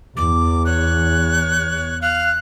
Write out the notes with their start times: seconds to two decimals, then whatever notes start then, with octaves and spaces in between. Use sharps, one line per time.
0.16 E2 D6
0.65 C#5 F#6
2.02 F5 F#6